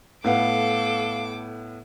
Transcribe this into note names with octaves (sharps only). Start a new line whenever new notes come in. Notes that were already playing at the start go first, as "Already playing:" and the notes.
A2 B3 A4 F5 F#5 D6